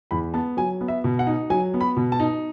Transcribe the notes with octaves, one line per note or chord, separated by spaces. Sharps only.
E2 B5
B3 A5
F#3 G#5
B3
E5
B2
F#5
D#4
F#3 G#5
B3
B5
B2
A5
D#4